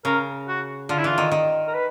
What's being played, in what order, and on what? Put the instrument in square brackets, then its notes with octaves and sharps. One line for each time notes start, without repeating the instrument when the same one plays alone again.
[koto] C#3 [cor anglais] A#4
[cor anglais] F#4
[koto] D3 [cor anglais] F4
[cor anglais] E4
[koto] E3 [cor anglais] F4
[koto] D#3
D#3
[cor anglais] A#4
B4